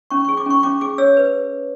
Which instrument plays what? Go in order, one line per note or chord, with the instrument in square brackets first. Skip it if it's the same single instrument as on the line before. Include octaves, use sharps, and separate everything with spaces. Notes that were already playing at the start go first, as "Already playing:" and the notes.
[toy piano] C#4 C#6
C#6
G#4
D6
C#4 C#6
C#4 D6
G#4 D6
C#5 E6
B4